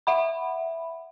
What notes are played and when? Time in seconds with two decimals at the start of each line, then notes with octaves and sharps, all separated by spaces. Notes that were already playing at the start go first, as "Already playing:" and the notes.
0.07 E5 F#5 B5